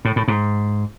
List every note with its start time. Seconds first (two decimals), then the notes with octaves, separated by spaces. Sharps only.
0.05 A2
0.16 A2
0.28 G#2